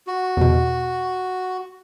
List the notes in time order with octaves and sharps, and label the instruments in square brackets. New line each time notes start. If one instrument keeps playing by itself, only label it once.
[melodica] F#4
[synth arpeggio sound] E2 B2